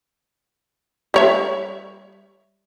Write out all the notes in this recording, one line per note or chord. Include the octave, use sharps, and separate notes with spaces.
G3 C#5 E5